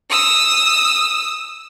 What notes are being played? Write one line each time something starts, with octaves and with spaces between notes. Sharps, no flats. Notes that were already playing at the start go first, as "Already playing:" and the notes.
D#6 E6